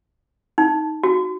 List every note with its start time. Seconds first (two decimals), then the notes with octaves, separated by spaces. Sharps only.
0.58 D#4
1.03 F#4